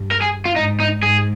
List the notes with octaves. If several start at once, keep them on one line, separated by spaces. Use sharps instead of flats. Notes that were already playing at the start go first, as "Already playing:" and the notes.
Already playing: G2
A#4
G#4
F4
G#2 D#4
D#4
G#2 G#4